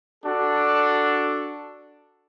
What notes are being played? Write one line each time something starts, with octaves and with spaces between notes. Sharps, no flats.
D4 F#4 A4